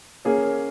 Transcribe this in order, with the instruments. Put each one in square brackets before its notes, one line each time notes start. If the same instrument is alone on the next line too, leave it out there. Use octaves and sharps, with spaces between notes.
[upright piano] A#3 C#4 G#4